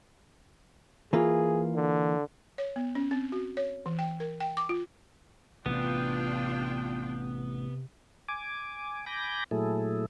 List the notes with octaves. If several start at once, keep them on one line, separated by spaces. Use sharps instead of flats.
E3 A#3 F4 G#4
D3
C#5
B3
C#4
C4
F#4
C#5
E3
G5
A#4
G5
D6
F4
A1 C3 B3 D4 F4 G5
G#5 D6
G#5 B5 D6 G6 A#6
A#2 F#3 A3 E4 G#4 A4